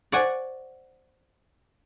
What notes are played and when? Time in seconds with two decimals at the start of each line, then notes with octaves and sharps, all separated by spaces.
0.12 C5 D5 F#5 G#5 C#6